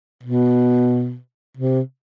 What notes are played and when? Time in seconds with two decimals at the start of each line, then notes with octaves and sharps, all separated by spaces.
0.23 B2
1.57 C3